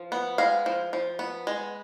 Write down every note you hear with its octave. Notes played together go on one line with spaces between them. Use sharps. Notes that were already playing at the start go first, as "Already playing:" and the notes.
Already playing: F3
B3
G#3 F5
F3
F3
B3
G#3